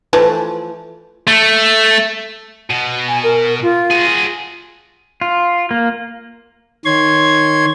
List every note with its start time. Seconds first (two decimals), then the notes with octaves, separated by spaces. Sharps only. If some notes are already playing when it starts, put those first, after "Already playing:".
0.13 E3 F3 A3
1.27 A3
2.70 B2
3.08 G#5
3.24 A#4
3.62 F4
3.91 F#4 G#4
5.21 F4
5.71 A#3
6.85 D#3 C#5 C6 G#6